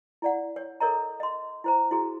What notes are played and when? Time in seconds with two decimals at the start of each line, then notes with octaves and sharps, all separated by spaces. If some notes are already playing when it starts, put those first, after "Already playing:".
0.22 E4 D5 F#5
0.56 C#5
0.80 A4 A#4 C#5 D#5 A#5
1.20 D#5 C6
1.64 E4 C5 A#5
1.91 E4 F#4 G#4